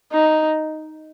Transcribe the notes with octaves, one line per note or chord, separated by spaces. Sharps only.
D#4